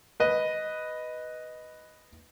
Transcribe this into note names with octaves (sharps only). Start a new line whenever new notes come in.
B4 D#5